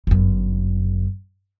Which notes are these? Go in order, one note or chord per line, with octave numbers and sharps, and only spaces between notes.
G1 F#2